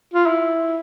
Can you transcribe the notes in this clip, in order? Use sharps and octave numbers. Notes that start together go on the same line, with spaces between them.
F4
E4